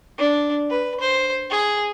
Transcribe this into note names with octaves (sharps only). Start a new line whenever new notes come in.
D4
B4
C5
G#4